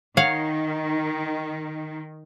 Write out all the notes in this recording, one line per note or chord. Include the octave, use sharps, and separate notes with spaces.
D#3 C#5 F5 F#5